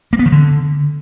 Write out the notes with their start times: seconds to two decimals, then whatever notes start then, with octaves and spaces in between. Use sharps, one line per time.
0.13 A#3
0.19 B3
0.26 D#3
0.32 D3